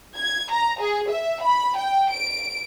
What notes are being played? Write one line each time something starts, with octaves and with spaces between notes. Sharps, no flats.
G#6
A#5
G#4
E5
B5
G5
D7